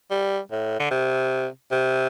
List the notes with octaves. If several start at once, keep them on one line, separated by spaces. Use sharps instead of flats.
G3
A2
D3
C3
C3